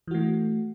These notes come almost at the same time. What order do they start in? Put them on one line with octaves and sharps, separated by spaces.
E3 F#4 A3